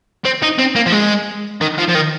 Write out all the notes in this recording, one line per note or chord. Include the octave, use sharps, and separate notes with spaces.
C4
D#4
C4
A#3
F3
G#3
D#3
F3
F3
D#3